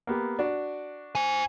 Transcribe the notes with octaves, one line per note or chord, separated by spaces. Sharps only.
A#3 B3 G4
D4 F#4
C5 G#5